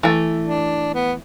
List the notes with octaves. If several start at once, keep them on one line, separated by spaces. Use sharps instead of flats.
E3 A3
D4
B3